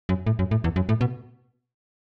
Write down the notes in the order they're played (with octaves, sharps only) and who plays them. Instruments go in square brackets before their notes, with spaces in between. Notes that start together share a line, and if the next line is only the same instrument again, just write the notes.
[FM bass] F#2
A2
F#2
A2
E2
F#2
A2
B2